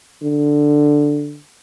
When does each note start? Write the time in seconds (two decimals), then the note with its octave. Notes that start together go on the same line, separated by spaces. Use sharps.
0.23 D3